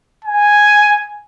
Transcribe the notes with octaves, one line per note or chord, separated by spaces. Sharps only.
G#5